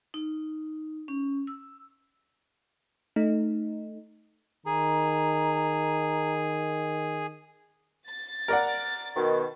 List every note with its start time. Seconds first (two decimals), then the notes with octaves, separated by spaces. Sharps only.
0.14 D#4
1.08 C#4
1.47 E6
3.16 A3 D#4
4.66 D#3 G#4 A#5
8.07 A6
8.48 A#4 D5 F#5
9.16 B2 D#3